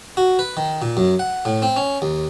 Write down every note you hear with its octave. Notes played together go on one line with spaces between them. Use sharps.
F#4
B4
D#3
A#2
F#2
F#5
A2
C4
C#4
D#2